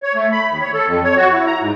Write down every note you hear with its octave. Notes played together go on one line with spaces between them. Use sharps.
C#5
A3
B5
D#2
C#5
A4
F2
C#5
F#4
E4
A#5
G#2